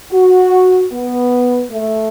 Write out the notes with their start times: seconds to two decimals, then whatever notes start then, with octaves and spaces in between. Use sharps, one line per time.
0.12 F#4
0.91 B3
1.70 A3